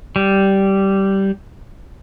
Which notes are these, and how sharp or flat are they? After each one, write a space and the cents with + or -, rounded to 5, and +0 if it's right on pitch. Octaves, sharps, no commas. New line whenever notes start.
G3 -10